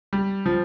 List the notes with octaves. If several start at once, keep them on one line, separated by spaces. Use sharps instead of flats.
G3
F3